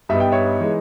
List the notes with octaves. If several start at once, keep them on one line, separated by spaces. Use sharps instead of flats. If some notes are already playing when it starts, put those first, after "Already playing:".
G2 G3 B3 D#4 E5
G5
C#5 E5
E3 G#3 D#4